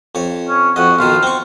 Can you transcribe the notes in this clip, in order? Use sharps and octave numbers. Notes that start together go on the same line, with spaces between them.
F2 C#5
C#4
F2 F#4 D#5
B1 B2 D#3 F4
C4 C#6